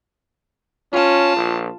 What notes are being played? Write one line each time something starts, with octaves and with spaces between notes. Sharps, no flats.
C#4 F4 A5
A#1